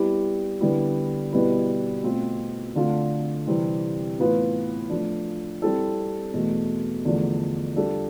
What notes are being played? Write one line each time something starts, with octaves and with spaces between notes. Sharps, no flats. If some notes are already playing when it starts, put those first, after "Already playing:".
Already playing: G3 B3 E4 G4
D3 G3 B3 E4
B2 G3 B3 E4 B4
B2 A3 C4 F4
D3 A3 D4 F4
C3 E3 G3 C4
A2 E3 B3 F4 B4
F3 A3 D4
G3 C4 E4 A4
E2 B2 A3
E2 D3 F3 A3 D4
G3 D4 F4 A4